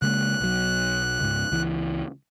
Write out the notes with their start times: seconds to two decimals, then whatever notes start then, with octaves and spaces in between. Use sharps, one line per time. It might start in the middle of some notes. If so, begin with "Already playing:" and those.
0.02 C#3 G#3 A#3 F#6
0.40 B1 F#3
1.20 C#2 G#2
1.51 C#2 E3